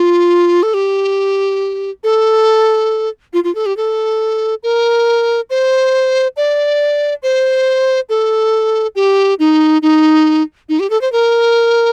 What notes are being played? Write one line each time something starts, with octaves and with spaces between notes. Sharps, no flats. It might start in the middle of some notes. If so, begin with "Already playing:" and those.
Already playing: F4
A4
G4
A4
F4
F4
A4
G4
A4
A#4
C5
D5
C5
A4
G4
D#4
D#4
D#4
G4
A4
C5
A#4